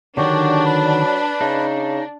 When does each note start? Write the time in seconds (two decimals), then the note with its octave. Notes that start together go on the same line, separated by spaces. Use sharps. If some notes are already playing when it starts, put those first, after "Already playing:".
0.17 D3 D#3 F#3 D4 F#4 G4
0.66 B4 B5
1.41 C#3 D#4